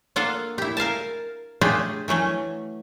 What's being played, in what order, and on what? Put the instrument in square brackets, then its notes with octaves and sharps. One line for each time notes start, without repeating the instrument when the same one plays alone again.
[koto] A#3 D4 F4 A4 F5 F#5
E4 G4
A#4 F5 G#5 A5
A3 C#4 D4 F4 G4 G#4
E3 F#3 A3 C#4